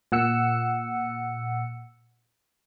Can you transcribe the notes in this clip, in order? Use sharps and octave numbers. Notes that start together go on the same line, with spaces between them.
A#2 F#5 E6 C#7